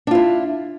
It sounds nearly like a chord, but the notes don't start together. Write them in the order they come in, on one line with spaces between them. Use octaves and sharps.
D4 F4 E4